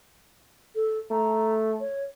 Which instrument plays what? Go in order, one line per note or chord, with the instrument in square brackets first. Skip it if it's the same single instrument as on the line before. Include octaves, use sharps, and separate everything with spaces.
[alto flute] A4
[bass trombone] A3 [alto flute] A#5
[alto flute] C#5